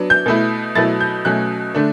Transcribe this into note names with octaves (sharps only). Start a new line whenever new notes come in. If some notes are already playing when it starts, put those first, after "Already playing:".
Already playing: F#3 B3 D4
G6
B2 A3 E4
B2 F#3 A3 E4 A6
G6
B2 F#3 A3 C#4 F#6
D3 A3 D4